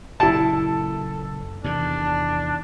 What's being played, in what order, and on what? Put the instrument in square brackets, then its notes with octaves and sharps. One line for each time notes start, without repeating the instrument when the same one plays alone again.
[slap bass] F#1 A#2 [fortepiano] E4 A5 [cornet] A4
[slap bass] E2 C3 D#3 [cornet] D4